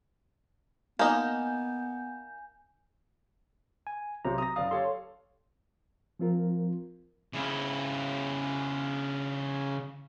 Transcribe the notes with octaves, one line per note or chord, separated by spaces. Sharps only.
A#3 B3 D#4 G#5 G6
G#5
B1 C3 C5 A#5
A#5 D#6 A#6
F#1 D5 F5 D#6
G4 A4 C#5 F5 C6
F3 C4 F4 A#4
C#3 E4